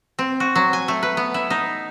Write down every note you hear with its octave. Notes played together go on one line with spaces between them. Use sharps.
C4
F#4
F#3
G#5
A3
B4
B3
E4
D#4